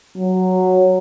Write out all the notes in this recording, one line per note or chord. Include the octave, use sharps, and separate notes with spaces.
F#3